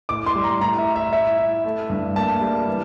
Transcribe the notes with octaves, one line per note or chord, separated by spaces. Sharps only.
A2 D6
C6
G3
A#5
A2 A#5
E5
E4
E5
E4 E5
E4
A3
G2
A#3 A5
G3
E3